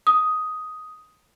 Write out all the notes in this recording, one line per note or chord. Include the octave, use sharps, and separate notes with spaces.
D#6